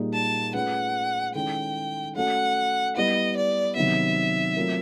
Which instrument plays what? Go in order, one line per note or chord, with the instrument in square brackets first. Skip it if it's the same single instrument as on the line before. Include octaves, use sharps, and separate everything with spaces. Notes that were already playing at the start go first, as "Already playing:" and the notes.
Already playing: [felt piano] A#2 G3 A#3 D#4 G#4
[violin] A5
[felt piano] A3 C#4 F4 G#4 B4 [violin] F#5
[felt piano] D#3 G#3 C#4 E4 A4 [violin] G5
[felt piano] A3 C#4 F#4 A4 [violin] F#5
[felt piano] G3 B3 E4 [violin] D#5
[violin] D5
[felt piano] C3 D#3 F#3 B3 [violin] E5
[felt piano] F#3 A3 C4 F4 A#4